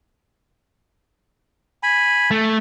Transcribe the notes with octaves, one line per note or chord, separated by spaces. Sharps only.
G#5 B5
A3